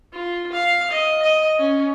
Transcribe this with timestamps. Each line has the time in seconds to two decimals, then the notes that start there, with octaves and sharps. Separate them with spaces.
0.12 F4
0.52 F5
0.90 D#5
1.22 D#5
1.59 C#4